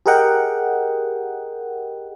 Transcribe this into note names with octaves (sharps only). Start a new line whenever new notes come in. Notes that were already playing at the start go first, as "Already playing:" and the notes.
G4 G#4 A#4 D#5 F#5 G5